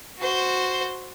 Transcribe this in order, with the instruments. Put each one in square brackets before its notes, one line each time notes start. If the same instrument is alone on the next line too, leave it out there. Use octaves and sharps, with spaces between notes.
[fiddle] F#4 C5